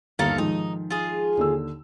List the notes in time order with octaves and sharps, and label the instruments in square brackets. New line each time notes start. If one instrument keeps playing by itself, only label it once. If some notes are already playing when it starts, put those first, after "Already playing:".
[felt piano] G1 D#2 A#5 [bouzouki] D#3 A4 F5
[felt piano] G#2 D#3 F3 [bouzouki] D#4
[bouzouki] F4 G#4
[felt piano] D#2 D3 E6